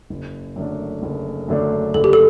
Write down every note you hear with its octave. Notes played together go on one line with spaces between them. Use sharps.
F#1
F#2 D3 A3 D4
F#1
F#2 D3 A3 D4
F#1 A4
G4
A4